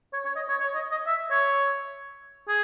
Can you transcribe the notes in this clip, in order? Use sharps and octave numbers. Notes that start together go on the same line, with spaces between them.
C#5
C#5
D#5
C#5
C#5
D#5
D#5
E5
C#5
G#4